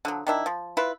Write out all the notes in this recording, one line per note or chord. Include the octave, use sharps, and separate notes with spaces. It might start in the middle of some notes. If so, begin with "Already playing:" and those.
D3 F3 F#3
D#3 D4 E4
F3
E4 F4 B4